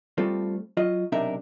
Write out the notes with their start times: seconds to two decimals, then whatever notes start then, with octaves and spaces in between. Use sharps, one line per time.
0.18 G3 A3 C4 F4 A4
0.77 F#3 F4 D#5
1.12 B1 C3 D4 D#4 A#4 E5